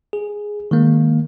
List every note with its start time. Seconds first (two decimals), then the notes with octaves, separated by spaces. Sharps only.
0.13 G#4
0.71 D#3 G#3 A#3